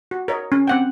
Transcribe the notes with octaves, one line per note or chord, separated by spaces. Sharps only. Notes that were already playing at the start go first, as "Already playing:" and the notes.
F#4
A#4 C#5 D#5
C#4
C4 F#5 G5